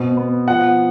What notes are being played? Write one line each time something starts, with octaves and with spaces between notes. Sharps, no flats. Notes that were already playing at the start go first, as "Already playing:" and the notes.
Already playing: B2 C4
B3
F3 F#5